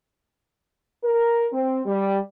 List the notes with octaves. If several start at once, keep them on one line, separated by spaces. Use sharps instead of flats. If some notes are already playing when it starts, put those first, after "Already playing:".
A#4
C4
G3